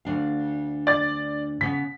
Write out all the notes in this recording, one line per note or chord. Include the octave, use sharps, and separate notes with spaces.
D2 D4 F5
D5 A6
C#3 B3 B6